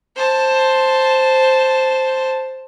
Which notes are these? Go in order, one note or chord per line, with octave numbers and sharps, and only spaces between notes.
C5 A5